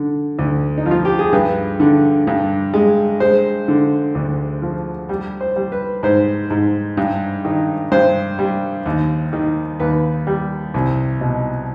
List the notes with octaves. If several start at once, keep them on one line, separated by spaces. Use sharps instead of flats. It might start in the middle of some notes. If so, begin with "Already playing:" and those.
Already playing: D3
D2
D#4
F3
F4
G4
G#4
G2 B4
D3
G2
G#3
G#3 C5
D3
D2
F3
G3
C5
G3
B4
G#2 C5
G#2
G2
D#3
G2 C5
G3
D#2
D#3
D#2 B4
G3
C2
B2